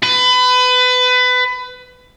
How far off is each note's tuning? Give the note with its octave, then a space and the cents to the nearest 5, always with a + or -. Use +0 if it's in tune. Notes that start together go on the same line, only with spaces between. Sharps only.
B4 +25